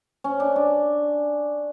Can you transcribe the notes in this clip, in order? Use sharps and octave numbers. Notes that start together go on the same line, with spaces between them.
C#4
D4
D4